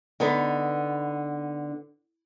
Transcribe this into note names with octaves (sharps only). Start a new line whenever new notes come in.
D3 B3 D#4